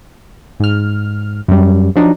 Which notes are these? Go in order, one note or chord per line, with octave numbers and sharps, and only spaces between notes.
G#2 F6
F#2 G3
F3 F#3 D4 D#4